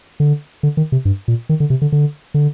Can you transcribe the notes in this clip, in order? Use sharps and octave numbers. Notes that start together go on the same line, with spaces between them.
D3
D3
D#3
C3
G2
A#2
D#3
D3
C3
D3
D3
D3